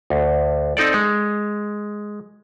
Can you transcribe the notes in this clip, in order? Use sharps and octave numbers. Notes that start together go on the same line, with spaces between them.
D2
C4 D#4 A4 D5
G#3